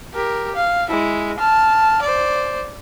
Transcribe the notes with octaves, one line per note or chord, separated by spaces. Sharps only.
G4 A#4
F5
G#3 E4
A5 F6
C5 D5